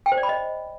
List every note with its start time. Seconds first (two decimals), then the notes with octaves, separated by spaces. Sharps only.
0.06 G5
0.12 C5
0.17 D5
0.23 B5
0.29 D#5